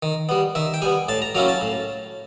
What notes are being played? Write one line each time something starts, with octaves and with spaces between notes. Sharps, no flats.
D#3
G3 B3
D#3 E5
G5
G3 B3 G#5
A2 A5
A#5
F#3 A#3 C#4 E4 A#5
A5
A2